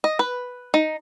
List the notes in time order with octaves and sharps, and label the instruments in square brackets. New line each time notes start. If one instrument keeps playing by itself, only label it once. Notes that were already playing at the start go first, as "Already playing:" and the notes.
[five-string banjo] D#5
B4
D#4